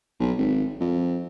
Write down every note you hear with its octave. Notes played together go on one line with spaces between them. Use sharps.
B1
G#1
F2